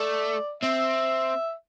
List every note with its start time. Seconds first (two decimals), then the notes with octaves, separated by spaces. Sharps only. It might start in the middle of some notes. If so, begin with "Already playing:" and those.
Already playing: A3 D5
0.62 C4 E5